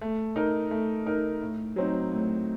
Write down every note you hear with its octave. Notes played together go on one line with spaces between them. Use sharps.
A3
D#4 A#4
A3
D#4 A#4
A2
F#3 C4 D#4
A2